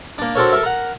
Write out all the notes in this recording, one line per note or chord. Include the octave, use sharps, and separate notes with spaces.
A#3 D4
C4 D4 F#4 A4 A#4 C#5
A4 A#4 E5
A#4 F#5